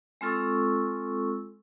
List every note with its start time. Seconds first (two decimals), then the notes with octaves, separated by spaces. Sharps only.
0.21 G#3 C4 F4 A4 C#6 E6